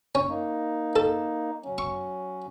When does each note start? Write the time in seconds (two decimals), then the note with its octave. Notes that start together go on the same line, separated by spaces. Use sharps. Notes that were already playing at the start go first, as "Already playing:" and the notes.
0.15 C#4
0.29 A#3 D#4
0.96 A4
1.64 F#3 C#4
1.78 C#6